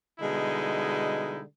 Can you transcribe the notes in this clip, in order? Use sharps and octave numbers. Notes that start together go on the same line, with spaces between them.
B2 D3 G3 G#3 D#4 E4